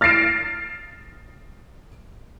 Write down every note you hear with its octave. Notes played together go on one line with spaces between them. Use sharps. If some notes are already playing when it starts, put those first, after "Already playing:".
F6 A6 A#6 C7 D7 E7